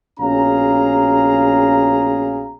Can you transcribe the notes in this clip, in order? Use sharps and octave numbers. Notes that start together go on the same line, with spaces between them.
A#1 B2 C#4 G#4 F5 A#5